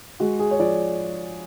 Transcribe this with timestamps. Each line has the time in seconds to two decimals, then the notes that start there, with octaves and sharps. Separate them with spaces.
0.20 G#3 F#4
0.39 G#4
0.51 C#5
0.59 F3 D5